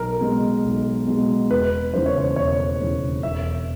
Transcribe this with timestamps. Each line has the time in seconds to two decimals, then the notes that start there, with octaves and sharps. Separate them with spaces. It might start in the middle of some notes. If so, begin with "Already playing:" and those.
Already playing: B1 A#4
0.21 B2 G#3
0.64 B1
1.07 B2 G#3
1.50 E1 B4
1.93 D#2 C#3 E3 C5
2.06 C#5
2.18 C5
2.36 E1 C#5
2.80 D#2 C#3 E3
3.23 E1 E5